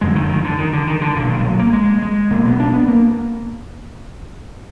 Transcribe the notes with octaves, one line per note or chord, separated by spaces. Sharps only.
F#1 F2 D3 G#3
D#3
D#3
D3
D#3
D3
D#3
D3
B1 A#2 D3
D#3
G#3
F#3
A#3
G#3
G#3
B1 B2 A#3
B3
D4
B3
A#3